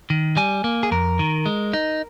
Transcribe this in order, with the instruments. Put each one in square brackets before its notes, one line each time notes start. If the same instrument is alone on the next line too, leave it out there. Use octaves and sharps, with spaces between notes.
[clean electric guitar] D#3
G3 G#5
A#3
G#4
F2 A#4
D#3
G#3
D#4